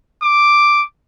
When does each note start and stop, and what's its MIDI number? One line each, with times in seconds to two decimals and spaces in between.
0.23 0.83 86